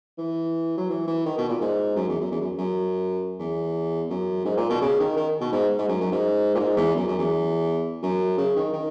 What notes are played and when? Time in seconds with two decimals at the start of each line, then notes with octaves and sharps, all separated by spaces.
0.18 E3
0.77 F#3
0.90 E3
1.07 E3
1.25 D#3
1.37 B2
1.49 A#2
1.61 G#2
1.96 F#2
2.09 E2
2.21 F#2
2.31 E2
2.41 F#2
2.58 F#2
3.39 E2
4.10 F#2
4.45 G#2
4.57 A#2
4.70 B2
4.81 C#3
5.00 D#3
5.16 D#3
5.41 B2
5.52 G#2
5.79 G#2
5.88 F#2
6.01 F#2
6.12 G#2
6.55 A#2
6.59 G#2
6.77 E2
6.96 F#2
7.08 F#2
7.19 E2
8.03 F#2
8.38 C#3
8.56 D#3
8.73 D#3